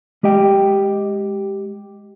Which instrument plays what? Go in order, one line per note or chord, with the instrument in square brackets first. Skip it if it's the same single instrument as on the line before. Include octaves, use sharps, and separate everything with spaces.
[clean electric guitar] G#3 G4 D#5 G5